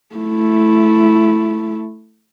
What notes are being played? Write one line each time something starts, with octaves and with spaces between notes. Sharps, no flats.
A3 E4